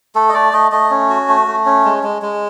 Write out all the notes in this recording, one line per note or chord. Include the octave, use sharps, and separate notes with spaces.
A3 A4
D#5
A3 D5
A3 D#5
A3 D#5
C#4
F#4
A3
A3
C#4
G#3
G#3
G#3